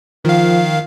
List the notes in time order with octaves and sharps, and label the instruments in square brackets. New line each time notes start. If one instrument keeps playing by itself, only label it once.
[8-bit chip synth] D#3 F5 [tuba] F3